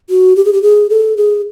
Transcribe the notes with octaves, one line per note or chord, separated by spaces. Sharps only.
F#4
G4
G#4
G4
G#4
A4
G#4